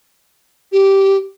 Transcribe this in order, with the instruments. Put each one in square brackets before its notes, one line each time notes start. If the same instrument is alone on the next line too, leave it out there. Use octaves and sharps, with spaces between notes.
[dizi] G4